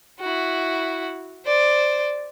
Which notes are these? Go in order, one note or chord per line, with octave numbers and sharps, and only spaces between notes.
E4 F#4
C5 D5